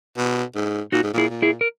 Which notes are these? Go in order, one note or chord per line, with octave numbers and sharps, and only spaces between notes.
B2
G#2
A#2 D#4 F#4
G#2
A#2 E4 G#4
A#2
E4 G#4
A#4